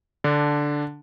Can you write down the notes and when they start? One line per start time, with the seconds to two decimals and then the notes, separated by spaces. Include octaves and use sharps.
0.24 D3 D4